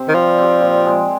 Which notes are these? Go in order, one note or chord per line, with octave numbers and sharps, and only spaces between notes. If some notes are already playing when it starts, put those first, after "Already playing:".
Already playing: C3 C4 G4
D#3
F3 G3
C4 G4
A#2
G#3 C4